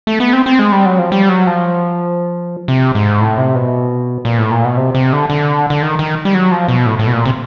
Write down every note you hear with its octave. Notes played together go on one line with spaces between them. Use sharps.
A3
B3
C4
C4
G#3
G3
F#3
F3
G3
F#3
F3
C3
G#2
A2
C3
B2
A#2
A2
A#2
B2
C3
C3
D3
D3
D3
D#3
D#3
G3
F#3
F3
B2
A2
A2
B2
A#2
C3